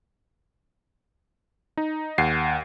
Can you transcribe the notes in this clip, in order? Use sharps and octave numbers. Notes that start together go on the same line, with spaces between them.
D#4
D#2 F#5 C7